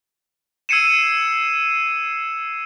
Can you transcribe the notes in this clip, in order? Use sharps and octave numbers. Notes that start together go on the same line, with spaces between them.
E6 G#6 C7 C#7 D#7 E7